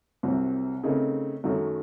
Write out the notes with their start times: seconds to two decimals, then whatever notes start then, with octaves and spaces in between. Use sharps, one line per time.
0.23 C2 C3 F#3 C4
0.83 C#3 A3 C4 D#4 A#4
1.44 F#2 D#3 F#3 A3